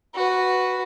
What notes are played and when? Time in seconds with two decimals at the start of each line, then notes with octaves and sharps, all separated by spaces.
0.15 F#4 B4